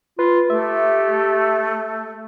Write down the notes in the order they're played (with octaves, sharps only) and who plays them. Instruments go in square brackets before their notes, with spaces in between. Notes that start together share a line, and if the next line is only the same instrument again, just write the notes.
[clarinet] F4 [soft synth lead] B4
[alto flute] A3 [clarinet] G4 [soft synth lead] E5